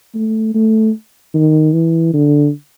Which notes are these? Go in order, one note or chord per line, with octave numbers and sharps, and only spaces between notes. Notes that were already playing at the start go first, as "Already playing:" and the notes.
A3
A3
D#3
E3
D3